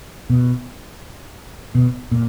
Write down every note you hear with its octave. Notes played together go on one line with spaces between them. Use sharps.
B2
B2
A#2